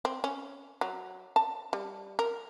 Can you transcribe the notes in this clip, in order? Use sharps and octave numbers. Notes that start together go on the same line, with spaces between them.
C4
C#4
F#3
A5
G3
A#4